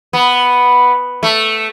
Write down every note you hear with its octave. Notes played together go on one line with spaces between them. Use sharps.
B3
A3